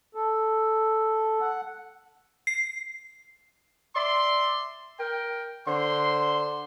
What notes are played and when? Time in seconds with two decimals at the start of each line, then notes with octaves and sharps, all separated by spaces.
0.15 A4
1.41 F#5
2.47 C7
3.95 D5 E5 C6
4.98 A#4 G5
5.66 D3 C5 C6